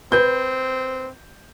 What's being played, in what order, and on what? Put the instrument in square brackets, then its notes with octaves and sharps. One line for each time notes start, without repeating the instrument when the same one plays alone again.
[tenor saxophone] C4 [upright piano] B4 G6